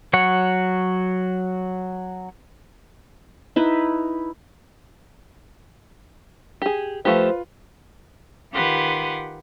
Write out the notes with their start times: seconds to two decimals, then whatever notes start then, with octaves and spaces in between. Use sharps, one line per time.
0.13 F#3 C#5 F#5
3.56 D#4 E4 B4
6.62 G4 G#4
7.05 F3 A3 F4 G4 B4 C5
8.52 D#3 F4 G4 B4 F#5 C6